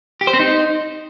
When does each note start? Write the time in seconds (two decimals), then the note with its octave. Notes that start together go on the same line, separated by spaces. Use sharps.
0.21 G4
0.27 C5
0.33 C4
0.40 D#4